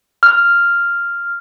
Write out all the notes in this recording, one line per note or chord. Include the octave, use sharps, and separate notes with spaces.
F6